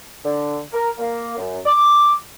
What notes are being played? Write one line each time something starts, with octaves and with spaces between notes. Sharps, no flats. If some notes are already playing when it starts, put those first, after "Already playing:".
D3
A#4
A#3
F#2
D6